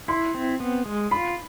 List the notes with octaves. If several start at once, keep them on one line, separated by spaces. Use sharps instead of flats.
E4 C6
C4
B3
G#3
F4 B5